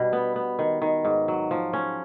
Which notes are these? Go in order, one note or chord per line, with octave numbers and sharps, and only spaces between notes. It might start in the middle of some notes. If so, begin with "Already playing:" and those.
Already playing: B2 G3 D4
B3
B3
D#3
D#3
G#2
F#3
F3
C#4